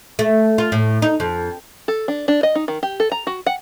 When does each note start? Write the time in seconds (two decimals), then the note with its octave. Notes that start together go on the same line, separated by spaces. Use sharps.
0.19 A3
0.58 F4
0.72 A2
1.02 D#4
1.20 F2
1.88 A4
2.08 D4
2.28 D4
2.43 D#5
2.55 D#4
2.68 D#3
2.83 G4
3.00 A4
3.12 A#5
3.27 F#4
3.46 F#5